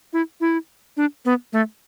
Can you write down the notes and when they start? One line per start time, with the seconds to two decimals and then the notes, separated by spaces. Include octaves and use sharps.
0.13 E4
0.41 E4
0.97 D4
1.25 B3
1.53 A3